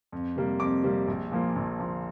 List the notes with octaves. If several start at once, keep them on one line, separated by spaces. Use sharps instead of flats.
F2
C3 G3 A#3
F2 D6
C3 G3 A#3
A#1
A#2 F3 A#3
A#1
A#2 F3 A#3